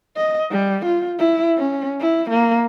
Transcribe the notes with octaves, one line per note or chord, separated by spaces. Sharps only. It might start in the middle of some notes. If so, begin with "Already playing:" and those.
D#5
G3
F4
E4
C#4
E4
A#3